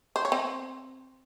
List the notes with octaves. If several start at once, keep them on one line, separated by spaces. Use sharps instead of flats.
C5
C#5
C4 C5